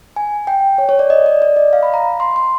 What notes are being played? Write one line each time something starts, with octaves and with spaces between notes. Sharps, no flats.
G#5
G5
C#5
C#5
D5
D#5
D5
D5
D#5
F5
B5
A#5
B5
C6
C6